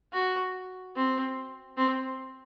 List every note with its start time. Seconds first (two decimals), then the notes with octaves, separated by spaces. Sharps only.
0.13 F#4
0.96 C4
1.77 C4